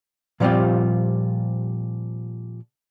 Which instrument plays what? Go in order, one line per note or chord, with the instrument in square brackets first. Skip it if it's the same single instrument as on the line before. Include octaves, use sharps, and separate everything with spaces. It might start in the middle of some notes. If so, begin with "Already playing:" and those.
[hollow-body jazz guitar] A#2 F3 G3 C4 F4 G4